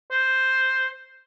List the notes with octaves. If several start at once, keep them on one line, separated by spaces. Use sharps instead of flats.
C5